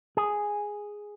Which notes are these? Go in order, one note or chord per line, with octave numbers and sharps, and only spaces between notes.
G#4